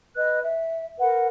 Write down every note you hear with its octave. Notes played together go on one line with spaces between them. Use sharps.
B4 D#5 F#6
E5
A#4 B4 F#5